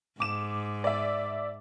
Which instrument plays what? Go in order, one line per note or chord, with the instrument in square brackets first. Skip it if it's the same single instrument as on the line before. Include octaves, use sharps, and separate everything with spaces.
[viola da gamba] G#2 [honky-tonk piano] D6 E7
[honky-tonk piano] D5 E5